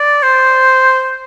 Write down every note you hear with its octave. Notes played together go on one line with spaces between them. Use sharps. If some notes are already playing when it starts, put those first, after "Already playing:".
Already playing: D5
C5